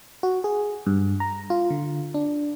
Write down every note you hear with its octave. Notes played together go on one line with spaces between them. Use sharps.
F#4
G#4
G2
A#5
F4
D3
D4